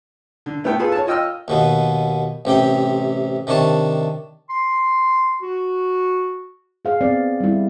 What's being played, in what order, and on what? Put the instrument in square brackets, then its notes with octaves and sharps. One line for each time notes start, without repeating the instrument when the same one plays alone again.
[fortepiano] D3
A3 B3 E4 G5
F4 G#4 A4 B4
C#5 A5
F4 D#5 G5 E6 F6
[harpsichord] D#2 B2 B3
A1 C3 G4 G5
C3 D#3 D4 C#5 A5
[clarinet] C6
F#4
[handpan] G#4 F5
B3 C4 D5
G3 E4